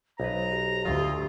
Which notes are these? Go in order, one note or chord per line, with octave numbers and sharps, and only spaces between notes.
B1 B4 C5 A#5
G4
D2 F4